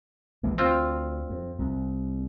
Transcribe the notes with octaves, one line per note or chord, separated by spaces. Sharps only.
A#1 E3 G#3
D2 C4 F4
F2
C2